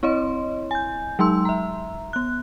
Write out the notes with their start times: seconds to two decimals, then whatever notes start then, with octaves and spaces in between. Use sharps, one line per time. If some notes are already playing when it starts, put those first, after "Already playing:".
0.03 C4 E4 C#5 D#5 C6
0.71 G#5 G6
1.19 F#3 G#3 D#4 C6 E6
1.45 E5 A#5
2.13 B3 F#6